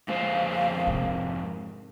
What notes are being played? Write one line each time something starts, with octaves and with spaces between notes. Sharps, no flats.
F2 G#3 C5 F5
G#2 C3